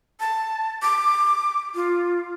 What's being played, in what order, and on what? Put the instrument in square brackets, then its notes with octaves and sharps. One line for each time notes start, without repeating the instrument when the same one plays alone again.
[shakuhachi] A5
D6
F4